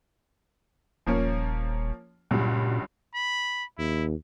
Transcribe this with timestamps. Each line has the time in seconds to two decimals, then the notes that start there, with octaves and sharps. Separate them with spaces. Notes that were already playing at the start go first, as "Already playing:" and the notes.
1.06 D#1 F3 A#3 C#4
2.31 C#2 G2 A#2 F#3
3.14 B5
3.78 D#2 E4